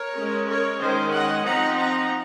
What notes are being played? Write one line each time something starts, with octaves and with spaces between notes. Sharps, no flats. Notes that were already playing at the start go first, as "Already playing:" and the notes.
Already playing: A#4 C#5
G#3 C#4
A#4 C#5
D#3 G#3 C#4 C5 D#5
D#5 F#5
F3 C4 D#4 F#5 A#5
F#5 A#5